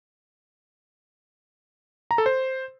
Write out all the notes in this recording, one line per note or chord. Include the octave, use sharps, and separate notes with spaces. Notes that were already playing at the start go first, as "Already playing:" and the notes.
A#5
A4
C5